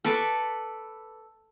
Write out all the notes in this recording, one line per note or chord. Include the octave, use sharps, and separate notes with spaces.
A4 B4 C#6 D6